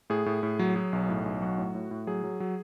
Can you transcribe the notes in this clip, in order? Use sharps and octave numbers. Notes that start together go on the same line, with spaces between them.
A2 G#4
A2
A2
F#3
F#3
B1
A2
B1
F#3 F#4
A2
A2
A2
F#3 G#4
F#3
F#3